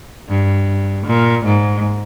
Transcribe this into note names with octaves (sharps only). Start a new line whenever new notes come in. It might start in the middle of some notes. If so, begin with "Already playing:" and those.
G2
A#2
G#2